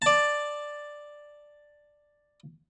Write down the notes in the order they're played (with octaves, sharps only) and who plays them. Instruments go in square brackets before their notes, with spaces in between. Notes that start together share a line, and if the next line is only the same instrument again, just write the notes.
[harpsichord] D5 A5